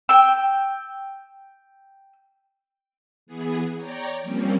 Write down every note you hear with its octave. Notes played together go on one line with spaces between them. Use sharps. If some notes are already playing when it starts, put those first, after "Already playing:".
G5 E6
E3 B3 G#4
C#5 D5 G5 A#5
F3 G3 A#3 C4 C#4